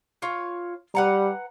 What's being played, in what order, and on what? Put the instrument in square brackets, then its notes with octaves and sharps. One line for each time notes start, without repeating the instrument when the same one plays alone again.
[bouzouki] F4 C#5
[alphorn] G3 [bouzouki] B4 F#5 A#5